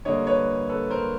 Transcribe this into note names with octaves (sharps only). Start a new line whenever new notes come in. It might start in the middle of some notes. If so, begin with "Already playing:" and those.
D3 G3 A#3 C#5 D#5
B4 C#5
A4 B4
A#4 C5